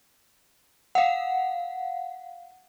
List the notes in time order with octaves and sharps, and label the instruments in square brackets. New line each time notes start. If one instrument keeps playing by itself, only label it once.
[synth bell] F5 F#5